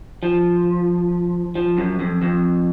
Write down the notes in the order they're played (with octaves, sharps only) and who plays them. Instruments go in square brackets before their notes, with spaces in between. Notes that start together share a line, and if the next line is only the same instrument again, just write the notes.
[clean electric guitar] F3
F3
F#2
F2
F2